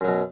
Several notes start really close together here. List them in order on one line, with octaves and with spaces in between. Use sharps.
F#2 F#3 B2